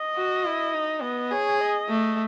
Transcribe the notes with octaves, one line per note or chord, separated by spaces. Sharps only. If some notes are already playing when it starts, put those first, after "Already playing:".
Already playing: D#5
F#4
E4
D#4
B3 D#5
G#4 C#5
D#5
A3